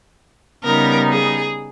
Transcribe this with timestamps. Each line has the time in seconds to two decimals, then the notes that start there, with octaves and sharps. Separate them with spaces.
0.64 C#3 G3 B3 D#4 A#4
1.10 G#4